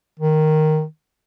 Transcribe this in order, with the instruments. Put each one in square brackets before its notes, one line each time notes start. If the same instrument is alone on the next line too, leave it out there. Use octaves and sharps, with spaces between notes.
[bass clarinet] D#3